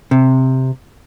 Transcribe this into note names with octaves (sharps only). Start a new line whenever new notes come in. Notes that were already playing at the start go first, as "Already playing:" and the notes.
C3